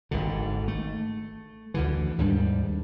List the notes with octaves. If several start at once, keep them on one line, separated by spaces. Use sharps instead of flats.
G#1 G#2 D3
A3
D2 D3 E3
D#2 G#2 G3 D4